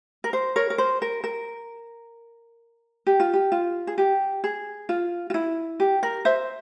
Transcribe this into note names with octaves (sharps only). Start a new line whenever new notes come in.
A#4
C5
A#4 C#5
A#4
C5
A#4
A#4
G4
F4
G4
F4
G#4
G4
G#4
F4
F4
E4
G4
A#4
C5 E5